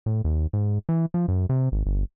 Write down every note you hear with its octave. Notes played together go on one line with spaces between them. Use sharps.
A2
D#2
G#2
E3
F3
F#2
C3
G#1
G1